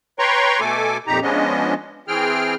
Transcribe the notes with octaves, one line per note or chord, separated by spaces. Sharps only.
B4 C#5 G5 A#5 C6 C#6
B2 A3 A4 G#5 D6
F2 A#2 D#4 G4 A#5
F3 G#3 B3 C#4 D4 D#5
E3 C4 G#4 G5 F6